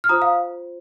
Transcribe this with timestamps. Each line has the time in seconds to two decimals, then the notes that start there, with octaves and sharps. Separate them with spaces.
0.04 F6
0.09 F4 C5 A#5 D#6
0.22 F5